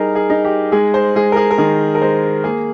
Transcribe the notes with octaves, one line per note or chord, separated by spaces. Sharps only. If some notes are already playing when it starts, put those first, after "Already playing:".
Already playing: G3 D#4 G#4 A#4
G#4
D#4
G4
G#3 G#4
C5
G#3 G#4
A#4
G#4
A#4
D#3 G#4
A#4
G#3 C5
A#3 G#4